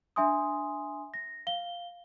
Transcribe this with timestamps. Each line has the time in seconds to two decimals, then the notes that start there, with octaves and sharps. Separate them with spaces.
0.16 D4 E5 G#5 C6 D#6
1.14 A#6
1.47 F5 G7